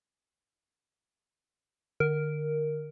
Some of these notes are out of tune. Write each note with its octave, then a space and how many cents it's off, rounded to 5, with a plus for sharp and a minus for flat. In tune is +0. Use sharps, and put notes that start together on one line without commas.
D3 +30 A#4 +0